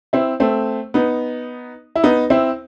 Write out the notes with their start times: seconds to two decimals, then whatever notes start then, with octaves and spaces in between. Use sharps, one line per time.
0.13 C4 E4
0.40 A3 C4
0.94 B3 D#4
1.96 E4
2.04 B3 D#4
2.30 C4 E4